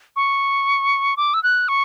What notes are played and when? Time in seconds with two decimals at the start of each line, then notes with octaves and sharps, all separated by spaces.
0.16 C#6
1.17 D6
1.34 E6
1.43 F#6
1.68 C#6